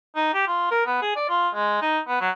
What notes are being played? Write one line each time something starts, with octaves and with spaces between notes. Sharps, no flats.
D#4
G4
F4
A#4
B3
G#4
D5
F4
G#3
D#4
B3
F#3